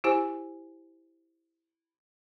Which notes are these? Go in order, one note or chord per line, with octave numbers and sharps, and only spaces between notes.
E4 G4 C5 G#5